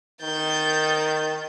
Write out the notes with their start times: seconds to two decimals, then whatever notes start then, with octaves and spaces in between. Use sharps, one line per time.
0.22 D#3 G6 A6